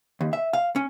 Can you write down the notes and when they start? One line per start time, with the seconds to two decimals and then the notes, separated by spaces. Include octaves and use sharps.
0.21 D#2
0.33 E5
0.53 F5
0.76 C#4